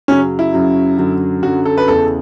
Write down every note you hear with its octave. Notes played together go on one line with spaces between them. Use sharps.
F#2 C#3 F#3 C#4
E4
F#2 C#3 F#3
F#2 D3 F#3
F#2 D3 F#3 F#4
A4
B4
E2 C#3 E3 A4